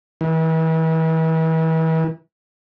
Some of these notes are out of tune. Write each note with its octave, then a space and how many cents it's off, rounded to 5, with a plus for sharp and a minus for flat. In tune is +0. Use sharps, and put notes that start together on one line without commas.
E3 -35